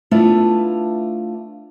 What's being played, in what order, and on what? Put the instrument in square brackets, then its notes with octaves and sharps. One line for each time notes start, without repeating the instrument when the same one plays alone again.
[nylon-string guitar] A3 B3 D4 E4 F4 B4